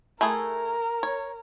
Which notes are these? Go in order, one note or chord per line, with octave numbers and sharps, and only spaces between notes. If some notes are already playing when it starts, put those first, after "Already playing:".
A3 E4 G#4 A#4
C#5